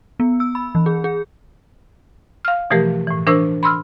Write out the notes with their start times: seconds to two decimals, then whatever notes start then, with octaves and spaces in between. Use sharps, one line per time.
0.20 B3
0.40 E6
0.55 B5
0.75 E3
0.86 G#4
1.04 G#4
2.45 F5 F6
2.70 B2 E3 F3 A3 G4 A#4
3.07 A2 E3
3.26 E3 D4 A#4 C5 C#6 E6
3.63 B5 C6 E6 F6